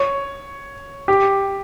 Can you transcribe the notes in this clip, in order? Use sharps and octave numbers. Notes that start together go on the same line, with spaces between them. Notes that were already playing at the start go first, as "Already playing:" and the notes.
Already playing: C#5
G4